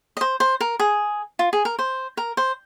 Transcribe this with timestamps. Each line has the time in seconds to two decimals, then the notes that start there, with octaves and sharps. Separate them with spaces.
0.17 D#5
0.21 C5
0.40 C5
0.61 A#4
0.79 G#4
1.39 F4
1.53 G#4
1.65 A#4
1.79 C5
2.17 A#4
2.37 C5